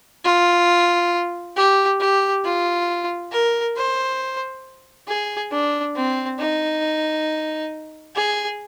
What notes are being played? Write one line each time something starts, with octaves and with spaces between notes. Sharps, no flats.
F4
G4
G4
F4
A#4
C5
G#4
D4
C4
D#4
G#4